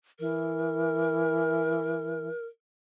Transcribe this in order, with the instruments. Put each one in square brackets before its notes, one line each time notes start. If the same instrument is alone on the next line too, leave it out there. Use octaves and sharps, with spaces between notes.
[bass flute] E3 [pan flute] A#4